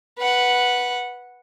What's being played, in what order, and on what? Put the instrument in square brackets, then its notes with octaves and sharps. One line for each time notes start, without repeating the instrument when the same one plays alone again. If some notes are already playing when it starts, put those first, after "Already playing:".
[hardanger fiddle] B4 F#5